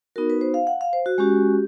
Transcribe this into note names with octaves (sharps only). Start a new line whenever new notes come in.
B3 D#4 F#4 A#4
B4
C5
F5
F#5
F5
C5
F#4
G#3 C#4 F#4 G4